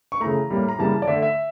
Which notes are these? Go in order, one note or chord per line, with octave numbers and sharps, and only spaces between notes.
C#6
C#3 E3 A3 A#5
A2 G3 A#3
A#5
C#3 E3 G3 A#3 A5
D5
D3 A3 E5
E5